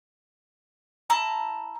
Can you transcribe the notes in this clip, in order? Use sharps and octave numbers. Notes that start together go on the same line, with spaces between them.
E4 A5 A#5